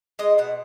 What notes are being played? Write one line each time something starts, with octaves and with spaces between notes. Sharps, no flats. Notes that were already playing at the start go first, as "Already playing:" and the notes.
G#3 D#5
B2 F#5